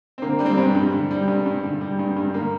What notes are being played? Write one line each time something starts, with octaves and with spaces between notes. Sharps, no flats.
C4
D3 A#3
G3 D4
C4
G2
G2
D3
G3
G2
G2
D3
G3
G2
G2
D3 A#3